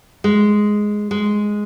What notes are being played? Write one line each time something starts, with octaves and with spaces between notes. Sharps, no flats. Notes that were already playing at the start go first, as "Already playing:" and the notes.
G#3
G#3